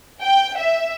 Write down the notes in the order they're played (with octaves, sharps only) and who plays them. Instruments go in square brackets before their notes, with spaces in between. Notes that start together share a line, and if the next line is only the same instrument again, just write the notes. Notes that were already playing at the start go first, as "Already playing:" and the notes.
[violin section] G5
E5